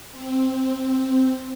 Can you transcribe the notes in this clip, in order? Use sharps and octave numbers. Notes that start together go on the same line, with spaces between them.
C4